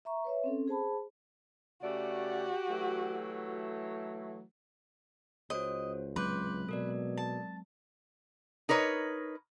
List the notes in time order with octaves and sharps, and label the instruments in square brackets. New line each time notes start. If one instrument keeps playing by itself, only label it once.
[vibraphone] E5 A#5 C#6
B4 C#5 E5
C4 C#4 A4
G#4 C5 A5 B5
[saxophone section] C#3 A3 D5 [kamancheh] F#4 G4
[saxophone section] E3 F#3 A3
[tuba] C#2 [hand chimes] F#4 C5 C#5 [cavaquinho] D#5
[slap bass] F#3 G#3 C4 [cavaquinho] B4 [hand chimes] C6 D6 G6
[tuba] B2 [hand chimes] A4 A#4 D5
[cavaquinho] A5
[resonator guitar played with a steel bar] D#4 A#4 B4 C#5